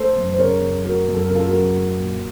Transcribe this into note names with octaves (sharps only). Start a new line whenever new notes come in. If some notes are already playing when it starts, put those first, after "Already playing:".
Already playing: A3 A4 C5
F#2
C5
C#3 A#4 C#5
F#2
A3 F#4 A#4
F#2
A4
C#3 A#4
F4 A4
F#4 A#4
F#2
A3
A#2